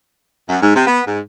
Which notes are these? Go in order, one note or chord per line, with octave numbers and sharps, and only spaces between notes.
F#2
G#2
C3
B3
G#2